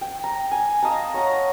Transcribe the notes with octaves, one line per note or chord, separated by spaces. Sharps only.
G5
A#5
G#5
D#5 F5 A5 A#5
C#5 F#5 A#5